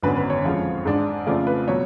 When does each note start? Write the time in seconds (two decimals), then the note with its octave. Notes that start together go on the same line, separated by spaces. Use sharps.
0.02 G#1 F#2 D3 F#3 B3 B4
0.16 B4
0.30 C#5
0.44 F2 F3 G#3 C#4 F4
0.85 G#2 G#3 D4
1.26 F2 C#3 F3 A3 F4 D5
1.47 B4
1.68 B2 F#3 C#5